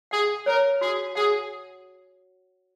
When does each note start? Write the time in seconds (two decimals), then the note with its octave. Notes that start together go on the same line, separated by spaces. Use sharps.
0.11 G#4 F#5
0.46 A#4 C#5
0.81 F#4 G#4
1.15 G#4 F#5